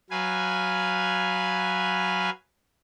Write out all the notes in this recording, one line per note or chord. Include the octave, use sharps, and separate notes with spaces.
F#3 B4 F5 G#5